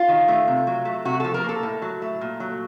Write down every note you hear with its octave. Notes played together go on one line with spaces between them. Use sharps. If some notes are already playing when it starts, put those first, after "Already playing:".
Already playing: F4
D#3
A3
C3
F#3
A3
C3 F#4
F3 A4
A#4
A#3 A4
A2
F#3
A3
A#2
F#3